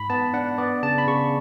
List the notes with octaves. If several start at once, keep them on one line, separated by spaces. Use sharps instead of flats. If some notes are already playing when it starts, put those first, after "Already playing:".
Already playing: G#2 B5
B3 A5
D4 F#5
B3 D5
C#3 A5
B5
C#3 C#6